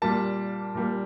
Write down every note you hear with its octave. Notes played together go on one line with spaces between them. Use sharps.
A#2 G3 A#3 A5
A#2 G3 A#3